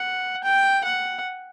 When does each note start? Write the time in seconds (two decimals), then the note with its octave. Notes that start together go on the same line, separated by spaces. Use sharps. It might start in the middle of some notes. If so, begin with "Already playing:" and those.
Already playing: F#5
0.43 G5
0.84 F#5